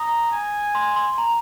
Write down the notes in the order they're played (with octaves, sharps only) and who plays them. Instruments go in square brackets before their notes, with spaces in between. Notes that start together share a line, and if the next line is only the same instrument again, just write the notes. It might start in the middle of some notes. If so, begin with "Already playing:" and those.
Already playing: [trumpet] A#5 [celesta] D#6
[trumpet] G#5
[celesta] C6
C6
A#5